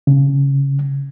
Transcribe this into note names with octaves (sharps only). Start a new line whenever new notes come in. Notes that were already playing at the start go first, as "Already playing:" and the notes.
C#3